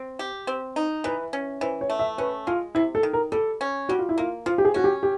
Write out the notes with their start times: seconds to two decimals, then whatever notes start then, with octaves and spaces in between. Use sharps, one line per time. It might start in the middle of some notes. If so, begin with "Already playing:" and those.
Already playing: C4
0.19 G4
0.47 C4
0.76 D#4
1.04 E3 B4
1.33 C#4
1.61 E3 C5
1.81 C#5
1.90 A3
1.99 E5
2.18 C#4 B4
2.47 G#3 F4
2.75 C3 E4
2.95 A4
3.03 D#3
3.13 A#4
3.32 G3 A4
3.61 C#4
3.89 G3 F#4
3.99 F4
4.09 E4
4.18 A#3 F4
4.46 F3 F4
4.58 G4
4.65 G#4
4.74 C#4 F#4
4.84 G4
5.03 G4